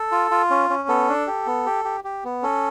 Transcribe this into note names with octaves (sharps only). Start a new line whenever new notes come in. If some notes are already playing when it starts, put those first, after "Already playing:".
Already playing: A4
F4
F4
C#4
C#4
B3 A4
D4
G4
B3
G4
G4
G4
B3
C#4 A4